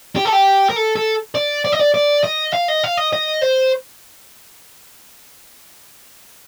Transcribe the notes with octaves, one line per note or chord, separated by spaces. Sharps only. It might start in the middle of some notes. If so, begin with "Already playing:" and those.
G4
A4
G4
A#4
A4
A4
D5
D5
D#5
D5
D5
D#5
F5
D#5
F5
D#5
D#5
C5